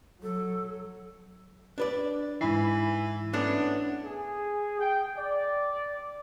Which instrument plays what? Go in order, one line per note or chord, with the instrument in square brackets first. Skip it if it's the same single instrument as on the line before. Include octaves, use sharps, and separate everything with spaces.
[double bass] F#3 [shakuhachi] A4
[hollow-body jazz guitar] D4 B4 D5
[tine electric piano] G#2 B5 C7 [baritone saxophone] E3
[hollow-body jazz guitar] A3 B3 C#4 [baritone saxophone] D4
[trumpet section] G#4
G5
D5